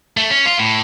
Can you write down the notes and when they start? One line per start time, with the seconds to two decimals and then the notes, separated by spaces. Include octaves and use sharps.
0.17 A3
0.30 C#4
0.46 F4
0.59 A2